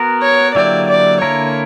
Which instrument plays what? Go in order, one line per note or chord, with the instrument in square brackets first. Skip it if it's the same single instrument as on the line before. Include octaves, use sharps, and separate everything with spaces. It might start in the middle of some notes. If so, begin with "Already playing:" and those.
Already playing: [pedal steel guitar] B3 F#4 A#4
[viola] C#5
[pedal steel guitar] D3 F#3 A#3 E4 G4 [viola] D5
[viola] D5
[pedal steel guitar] D3 A#3 E4 A#4 [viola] C#5